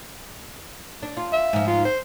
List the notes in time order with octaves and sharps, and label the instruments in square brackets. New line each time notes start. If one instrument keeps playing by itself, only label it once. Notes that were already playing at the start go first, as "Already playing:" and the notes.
[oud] D4
F4
[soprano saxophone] E5
[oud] G#2 F3
[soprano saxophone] F4
C5